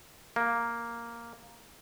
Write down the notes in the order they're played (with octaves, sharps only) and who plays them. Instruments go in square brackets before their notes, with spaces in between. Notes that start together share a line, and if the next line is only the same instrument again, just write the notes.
[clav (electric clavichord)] A#3